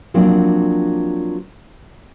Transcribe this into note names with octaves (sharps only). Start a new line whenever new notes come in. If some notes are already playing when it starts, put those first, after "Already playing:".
F3 F#3 A#3 C4 D4